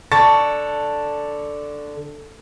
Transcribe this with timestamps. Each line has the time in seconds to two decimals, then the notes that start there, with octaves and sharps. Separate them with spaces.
0.12 D3 A5 C#6 A6